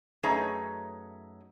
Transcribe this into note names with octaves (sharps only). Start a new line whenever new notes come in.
F#2 A3 D#4 G#4 B4 C#5